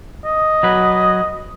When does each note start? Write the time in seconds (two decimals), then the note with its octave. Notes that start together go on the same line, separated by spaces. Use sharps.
0.25 D#5
0.63 F#3 B4